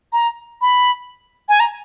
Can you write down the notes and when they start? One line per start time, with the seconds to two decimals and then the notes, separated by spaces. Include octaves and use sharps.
0.12 A#5
0.61 B5
1.49 G#5
1.60 A#5